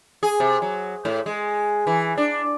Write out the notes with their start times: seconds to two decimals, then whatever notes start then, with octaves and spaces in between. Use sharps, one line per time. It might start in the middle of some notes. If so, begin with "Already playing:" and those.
0.23 G#4
0.40 C3
0.62 F#3
1.05 A2
1.26 G#3
1.87 E3
2.17 D4